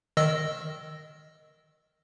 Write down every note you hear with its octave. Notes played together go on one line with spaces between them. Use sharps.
D#3 D#5 E6